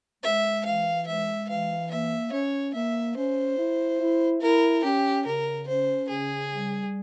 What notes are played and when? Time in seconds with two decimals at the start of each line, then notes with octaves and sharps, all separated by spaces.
0.23 G#3 E5
0.65 E3 F5
1.07 G#3 E5
1.48 E3 F5
1.90 A#3 E5
2.32 C#4 C#5
2.74 A#3 E5
3.16 C#4 C5
3.57 E4
4.00 E4
4.41 E4 A#4
4.84 C#4 G4
5.26 C#3 A#4
5.67 C#4 C5
6.09 C#3 G#4
6.51 G3